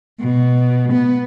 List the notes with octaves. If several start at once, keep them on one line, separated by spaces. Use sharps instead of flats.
B2
B3